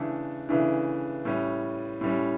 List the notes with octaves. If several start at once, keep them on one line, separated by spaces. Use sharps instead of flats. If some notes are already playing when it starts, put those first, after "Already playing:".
Already playing: C#3 E3 A3 D4 A4
C#3 E3 A3 D4
A2 G3 C#4
A2 G3 C#4